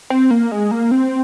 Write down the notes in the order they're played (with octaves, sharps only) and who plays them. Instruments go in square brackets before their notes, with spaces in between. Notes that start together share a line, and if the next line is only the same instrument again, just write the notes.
[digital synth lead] C4
A#3
G#3
A#3
C4